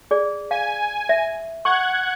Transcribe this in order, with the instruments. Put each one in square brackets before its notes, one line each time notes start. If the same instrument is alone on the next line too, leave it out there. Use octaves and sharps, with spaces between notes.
[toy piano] G#4 D5
[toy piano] F5 [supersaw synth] G#5
[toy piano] E5
[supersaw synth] F#5 F#6 G#6 [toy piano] C#6